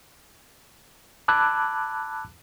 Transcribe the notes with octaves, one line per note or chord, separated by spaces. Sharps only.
A5 B5 D6 E6 F#6 G#6